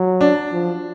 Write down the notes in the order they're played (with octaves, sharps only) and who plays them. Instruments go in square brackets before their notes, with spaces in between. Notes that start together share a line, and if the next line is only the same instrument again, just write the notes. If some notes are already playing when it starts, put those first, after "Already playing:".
Already playing: [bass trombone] F#3
[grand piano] D4
[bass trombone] F3